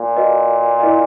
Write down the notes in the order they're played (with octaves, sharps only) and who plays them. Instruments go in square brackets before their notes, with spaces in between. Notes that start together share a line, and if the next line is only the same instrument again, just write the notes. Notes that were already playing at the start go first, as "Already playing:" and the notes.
Already playing: [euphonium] A#2
[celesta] F#4 B4 D#5
E4 A#4 D#5